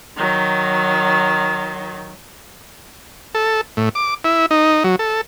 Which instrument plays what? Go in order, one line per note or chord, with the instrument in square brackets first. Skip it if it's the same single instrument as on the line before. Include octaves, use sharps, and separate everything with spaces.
[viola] D#3 F#3
[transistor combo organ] A4
A2
D6
E4
D#4
F#3
A4